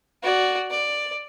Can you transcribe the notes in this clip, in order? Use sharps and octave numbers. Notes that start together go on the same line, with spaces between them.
F#4 D5
D5